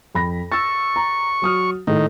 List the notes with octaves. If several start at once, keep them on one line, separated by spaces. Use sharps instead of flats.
F2 B5 A#6
C#6 E6 A6
A#5
F#3 D#6 F6
A2 D#3 A4